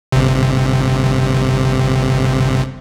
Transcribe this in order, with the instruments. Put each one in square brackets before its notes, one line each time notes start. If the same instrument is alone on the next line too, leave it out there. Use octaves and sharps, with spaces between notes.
[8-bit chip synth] G1 C3